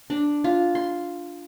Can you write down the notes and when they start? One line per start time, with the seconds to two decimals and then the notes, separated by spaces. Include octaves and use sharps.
0.10 D4
0.44 F4
0.75 C6